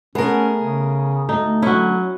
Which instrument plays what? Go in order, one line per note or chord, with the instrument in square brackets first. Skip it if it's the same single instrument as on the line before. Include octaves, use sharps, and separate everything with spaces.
[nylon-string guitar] A3 [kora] B3 [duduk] C#4 [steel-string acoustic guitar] G#4 A#4
[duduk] C#3
[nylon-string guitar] D2 A3 [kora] D#4
[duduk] F#3 [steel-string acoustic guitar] C#4 [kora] E4 F#4